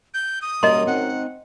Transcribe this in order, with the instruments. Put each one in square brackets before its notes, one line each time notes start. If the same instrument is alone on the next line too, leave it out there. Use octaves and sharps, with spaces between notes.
[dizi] G6
D#6
[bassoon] F#2 [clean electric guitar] G3 A#3 A#4 [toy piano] D#5 A#5 C6
[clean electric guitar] C4 D#4 [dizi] F#5